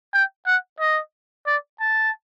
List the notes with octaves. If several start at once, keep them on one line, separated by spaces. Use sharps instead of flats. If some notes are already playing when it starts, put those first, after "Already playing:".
G5
F#5
D#5
D5
A5